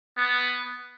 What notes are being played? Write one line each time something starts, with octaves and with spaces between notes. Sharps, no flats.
B3